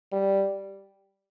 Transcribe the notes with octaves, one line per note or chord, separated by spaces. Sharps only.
G3